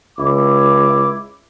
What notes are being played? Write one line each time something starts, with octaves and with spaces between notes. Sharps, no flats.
C#2 E4 D6